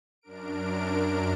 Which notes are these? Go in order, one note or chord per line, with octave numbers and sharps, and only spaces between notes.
F#2 D4 A#4 D7